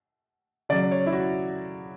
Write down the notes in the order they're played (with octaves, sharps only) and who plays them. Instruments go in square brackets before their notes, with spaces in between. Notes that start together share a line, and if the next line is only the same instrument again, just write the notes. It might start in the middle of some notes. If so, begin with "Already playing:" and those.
[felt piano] C#3 F#3 D5
C#5
E4
F#4